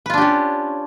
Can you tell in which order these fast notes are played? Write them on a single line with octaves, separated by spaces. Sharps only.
B4 F4 D4 G4 C#4